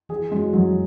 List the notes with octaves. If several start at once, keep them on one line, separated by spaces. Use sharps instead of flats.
E3 G#4
G#3 C#4 F#4
E3 F#3